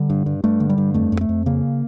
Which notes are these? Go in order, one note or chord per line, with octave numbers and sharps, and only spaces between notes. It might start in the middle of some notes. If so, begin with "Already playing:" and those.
Already playing: D3 G3
G2
G2
G2 A3
D3
G3
G2
F2 A3
F2
A3
F2
C#3 A#3